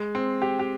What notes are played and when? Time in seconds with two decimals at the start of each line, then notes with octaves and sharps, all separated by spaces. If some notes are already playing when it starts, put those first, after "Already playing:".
Already playing: G#3
0.15 C4
0.42 G4
0.59 G4